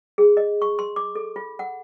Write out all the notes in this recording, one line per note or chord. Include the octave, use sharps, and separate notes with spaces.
G#4
D#5
C#6
C6
D6
A4
F4
F#5